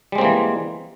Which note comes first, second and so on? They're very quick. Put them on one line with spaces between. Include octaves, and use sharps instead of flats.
G3 G#3 C4 A#3 E3